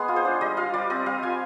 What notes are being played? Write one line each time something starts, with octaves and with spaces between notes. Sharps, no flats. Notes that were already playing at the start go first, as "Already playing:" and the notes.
Already playing: G#3 B3 G#4
F4
C5
D4
G3 D#5
F4 F5
G3 D5
C4 D#5
G3 F5
F4 G#5